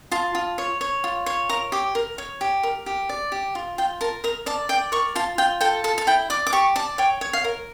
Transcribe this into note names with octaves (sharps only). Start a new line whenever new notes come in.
F4 A5
F4
C#5
C#5
F4
C#5
A#4 A#5
G4 D6
A#4
C#5
G4
A#4
G4
D5
G4
F4
F4 G5
A#4 A5
A#4 A#5
D5 A5
D5 G5
A#4 C#6
F4 A5
F4 G5
A4 G5
A4 A5
A5
E4 G5
D5 D6
D6
G4 C#6
D5 A5
C#5 G5
C#5
F5
A#4